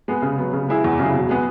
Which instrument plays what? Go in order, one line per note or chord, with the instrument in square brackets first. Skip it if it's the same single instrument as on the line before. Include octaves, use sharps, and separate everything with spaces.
[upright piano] G#3 B3 G#4
C#3
F#3 B3
C#3
G#3 E4 G#4
E2
C#3 F#3 E4 G#4
B2
G#3 B3 G#4